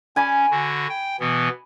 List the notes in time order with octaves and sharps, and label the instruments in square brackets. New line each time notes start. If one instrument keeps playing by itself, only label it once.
[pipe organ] C#4 [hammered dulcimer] G#5 B5 D6
[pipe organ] D3 F#4
G5
B2 E3 B3